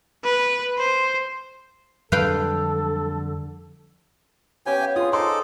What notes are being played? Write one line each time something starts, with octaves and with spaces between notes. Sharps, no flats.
B4
C5
F2 D3 F#3 G3 A4 B4 F5 G5
B3 C#4 G4 C#5 G5 G#5
F5
F4 G#4 F#5 C6 D#6
D#4 A4 C5 C6 D6